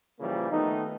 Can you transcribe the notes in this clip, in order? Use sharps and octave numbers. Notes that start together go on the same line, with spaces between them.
A#2 C#3 E3 F3 G3 A#3
D#3 A3 B3 D#4